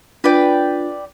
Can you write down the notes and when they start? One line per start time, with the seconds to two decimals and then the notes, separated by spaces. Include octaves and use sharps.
0.24 D4 F4 B4 D5 G5